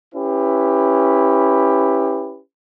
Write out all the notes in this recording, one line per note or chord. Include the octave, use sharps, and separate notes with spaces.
C#4 E4 G4 B4